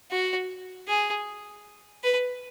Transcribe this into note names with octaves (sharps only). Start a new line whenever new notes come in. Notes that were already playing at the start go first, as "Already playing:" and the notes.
F#4
G#4
B4